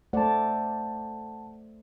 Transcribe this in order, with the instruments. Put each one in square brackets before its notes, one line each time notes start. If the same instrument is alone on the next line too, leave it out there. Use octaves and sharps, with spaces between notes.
[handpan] A3 C5 D5 [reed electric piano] F#5 A5